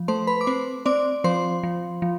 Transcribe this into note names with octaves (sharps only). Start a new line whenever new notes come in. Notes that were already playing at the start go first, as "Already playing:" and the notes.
Already playing: F3
A3 C5 C6
B4 B5
D6
C4 C5 C6
C4 D5 D6
F3 C5 C6
F3
F3